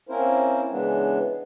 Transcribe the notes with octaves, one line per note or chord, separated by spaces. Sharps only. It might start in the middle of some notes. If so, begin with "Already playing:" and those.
A#3 C4 C#4 E4 A#4 C5
C#3 E3 G#3 B3 D4